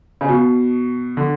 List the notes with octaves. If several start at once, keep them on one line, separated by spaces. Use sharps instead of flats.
C#3
B2
D3